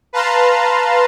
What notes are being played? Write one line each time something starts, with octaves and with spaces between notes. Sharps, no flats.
B4 F5 A5 A#5 C6